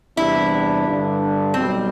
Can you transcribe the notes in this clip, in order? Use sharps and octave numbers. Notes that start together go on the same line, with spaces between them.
E2 C3 G3 D4 E4
G2 D3 G3 D4
B1 B2 G3 C4